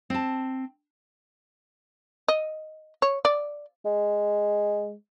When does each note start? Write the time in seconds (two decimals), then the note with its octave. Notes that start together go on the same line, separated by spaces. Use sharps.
0.10 C4 A5
2.28 D#5
3.02 C#5
3.25 D5
3.86 G#3